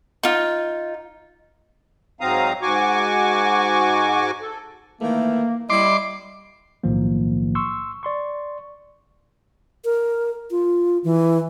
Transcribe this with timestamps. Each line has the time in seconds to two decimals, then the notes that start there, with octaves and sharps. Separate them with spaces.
0.23 D#4 F4
2.21 G#2 F#3 C4 F5 A#5 D#6
2.62 G#2 F#4 G#5 C#6 D6
4.41 A4
5.01 D#3 E3 A3 A#3
5.70 G3 E4 D#5 C6 D6
6.83 B1 A2 D#3 F3 A#3
7.55 C6 C#6 E6
8.03 D5 C6 C#6
9.85 A#4
10.51 F4
11.04 E3